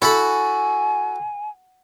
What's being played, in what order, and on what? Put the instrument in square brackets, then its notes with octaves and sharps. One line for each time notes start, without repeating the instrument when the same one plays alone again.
[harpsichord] E4 A4 B5 [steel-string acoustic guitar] F#4 [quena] G#5